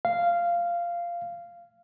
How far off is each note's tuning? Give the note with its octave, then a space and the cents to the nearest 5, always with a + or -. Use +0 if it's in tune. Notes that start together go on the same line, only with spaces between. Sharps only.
F5 -10